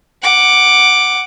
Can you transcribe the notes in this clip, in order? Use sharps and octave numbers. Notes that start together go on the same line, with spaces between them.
F#5 D6